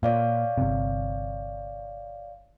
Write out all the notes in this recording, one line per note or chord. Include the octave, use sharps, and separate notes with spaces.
A#2 C#5 D5 F5
G1 C3